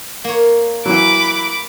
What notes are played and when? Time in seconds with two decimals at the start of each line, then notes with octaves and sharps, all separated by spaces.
0.24 A#3 C#5
0.86 E3 F#3 B5 D6